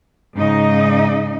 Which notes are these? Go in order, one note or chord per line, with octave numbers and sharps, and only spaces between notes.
G#2 C#3 D#4 D#5